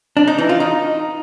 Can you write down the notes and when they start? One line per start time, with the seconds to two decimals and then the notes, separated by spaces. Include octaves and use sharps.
0.17 D4
0.28 D#4
0.38 E3
0.49 F4
0.60 D#4